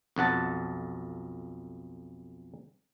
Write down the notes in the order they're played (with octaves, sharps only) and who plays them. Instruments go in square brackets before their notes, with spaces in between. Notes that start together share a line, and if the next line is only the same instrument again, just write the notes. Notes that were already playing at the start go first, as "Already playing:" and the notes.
[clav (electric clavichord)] B1 F2 F#5 A5